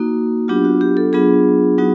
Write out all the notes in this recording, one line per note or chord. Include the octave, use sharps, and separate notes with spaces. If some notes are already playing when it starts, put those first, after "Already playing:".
Already playing: A#3 D#4 F#4
F#3 B3 D4 F4 G4
F#4
G4
A4
F#3 B3 D4 F4 G#4
F#3 B3 D#4 F#4